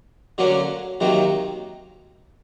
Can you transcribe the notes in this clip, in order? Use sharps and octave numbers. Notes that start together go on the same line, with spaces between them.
D3 F#3 A#3 C#4
C3 D#3 F#3 A#3